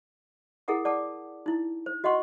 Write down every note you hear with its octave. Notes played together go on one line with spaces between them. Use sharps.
E4 G#4 A#4 F#5 D#6
D5 F#5 A5 D6
D#4 E4
C5
F#4 D#5 F#5 C6 C#6